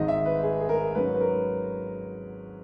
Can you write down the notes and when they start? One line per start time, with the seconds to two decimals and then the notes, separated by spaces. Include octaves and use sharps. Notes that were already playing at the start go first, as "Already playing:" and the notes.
Already playing: G#1 G#2 D#3 G#3 D#5
0.08 E5
0.25 B4
0.43 G#4
0.60 G#4
0.69 A#4
0.95 G#2 F#3 C#4 B4
1.14 B4
1.21 A#4